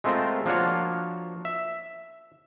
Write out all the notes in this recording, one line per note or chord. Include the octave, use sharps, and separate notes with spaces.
G#3 A3 C4 F4 A#4 C5
F3 A#3 D4 F4 F#4 C#5
E5